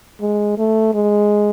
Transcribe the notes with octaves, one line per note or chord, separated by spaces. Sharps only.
G#3
A3
G#3